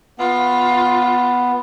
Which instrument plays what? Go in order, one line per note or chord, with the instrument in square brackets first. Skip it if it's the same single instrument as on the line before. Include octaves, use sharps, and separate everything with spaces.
[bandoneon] B3 [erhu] F4